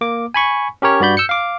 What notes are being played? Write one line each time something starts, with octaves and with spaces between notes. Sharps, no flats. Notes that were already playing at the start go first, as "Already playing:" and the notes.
A#3 D6
G#5 B5 C#6
C#4 G4 A#4 C#5
G2 F#4 D5 B5 G6
E6 G6 C#7
F5 D6